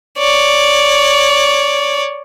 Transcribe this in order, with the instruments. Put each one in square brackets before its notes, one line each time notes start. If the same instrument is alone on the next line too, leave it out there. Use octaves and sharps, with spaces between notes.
[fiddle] C#5 D5